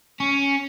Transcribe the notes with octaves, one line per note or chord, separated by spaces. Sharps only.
C#4